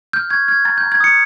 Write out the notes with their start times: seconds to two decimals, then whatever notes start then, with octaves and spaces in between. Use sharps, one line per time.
0.13 F6 G6
0.30 C#6 G#6
0.48 F6 G#6
0.65 A#5 A6
0.78 G6
0.83 A#5
0.92 G#6
1.00 D#6 C#7